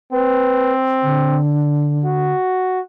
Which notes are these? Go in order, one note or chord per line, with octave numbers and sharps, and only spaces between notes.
C4 B4
D3
F#4